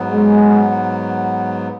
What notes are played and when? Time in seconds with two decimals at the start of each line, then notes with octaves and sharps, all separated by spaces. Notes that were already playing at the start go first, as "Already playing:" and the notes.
Already playing: G#2 F#3 B3
0.11 G#3